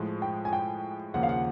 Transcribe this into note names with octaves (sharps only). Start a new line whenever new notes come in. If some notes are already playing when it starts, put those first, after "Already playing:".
Already playing: A2 F3 G#3
G5
G#5
G5
D#2 C#3 F3 A#3 F#5
F5
F#5